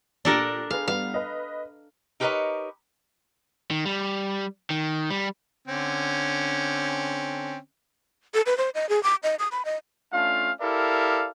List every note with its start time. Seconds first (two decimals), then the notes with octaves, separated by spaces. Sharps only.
0.25 A#2 D4 G4 A4 A#4 A#6
0.71 G#4 B4 F5
0.88 G3 B3 F5
1.14 B4 D#5
2.20 D#4 G4 A#4 B4 C#5 D#5
3.71 D#3
3.85 G3
4.70 D#3
5.10 G3
5.68 D3 C4 C#4
8.34 A4
8.46 B4
8.58 C5
8.75 D#5
8.89 G#4
9.03 D6
9.23 D#5
9.39 D#6
9.52 B5
9.65 D#5
10.13 A3 C#4 D4 F4 F5
10.61 E4 G4 A4 A#4 D5 F5